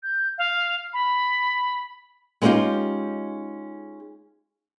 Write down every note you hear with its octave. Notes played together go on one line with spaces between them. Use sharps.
G6
F5
B5
G#3 B3 C#4 D#4 F4 G4